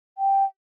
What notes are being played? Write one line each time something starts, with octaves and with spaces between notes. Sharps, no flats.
G5